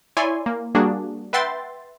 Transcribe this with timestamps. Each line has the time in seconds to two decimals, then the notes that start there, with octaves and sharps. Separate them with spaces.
0.17 E4 C#5 D5 G#5 C6
0.46 A#3
0.75 G3 A#3 D4 F#4 G#4
1.33 B4 E5 F#5 G5 C6 A6